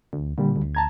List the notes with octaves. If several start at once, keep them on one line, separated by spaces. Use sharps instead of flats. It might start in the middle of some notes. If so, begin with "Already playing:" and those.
D2
A#2 D3 G3
D2
A5 A#5 G#6